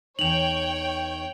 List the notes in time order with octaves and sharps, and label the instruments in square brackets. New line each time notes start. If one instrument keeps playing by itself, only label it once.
[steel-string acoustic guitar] E2 D#4 [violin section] C#5 G5 [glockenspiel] F7 F#7